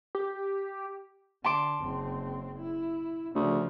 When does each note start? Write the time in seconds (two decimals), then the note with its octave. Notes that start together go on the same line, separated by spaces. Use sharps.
0.15 G4
1.44 D3 A5 C6 D6
1.80 F#1 C4
2.59 E4
3.35 D2 C#3 F3